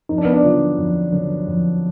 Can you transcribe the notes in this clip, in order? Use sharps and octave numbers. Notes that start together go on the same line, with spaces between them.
F2 D#4
D4
B3
D4
D3 F#3 F4
F2
D3 F#3
F2